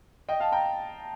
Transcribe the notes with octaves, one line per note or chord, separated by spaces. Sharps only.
D#5 G5
F5 A5
G5 A#5